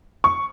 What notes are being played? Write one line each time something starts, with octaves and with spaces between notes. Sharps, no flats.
C#6